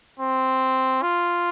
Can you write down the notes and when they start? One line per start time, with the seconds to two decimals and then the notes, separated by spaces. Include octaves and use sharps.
0.20 C4
1.03 F4